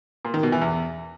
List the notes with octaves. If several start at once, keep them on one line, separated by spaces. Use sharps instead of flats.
A#2
D#3
B2
E3
E2